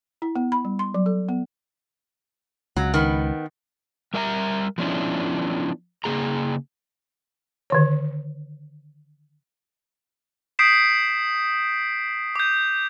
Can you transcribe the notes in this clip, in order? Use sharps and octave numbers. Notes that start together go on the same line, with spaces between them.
E4
B3
B5
G3
C6
F#3
A4
B3
C#2 F#3
D#3 B3
G3 A#4 E5 A5 A#5
F3 B3 C#4 D4 E4
C#3 A#3 G#4 A#5
D3 D#3 C#5
D#6 G6 B6 C7 D7 E7
D6 G6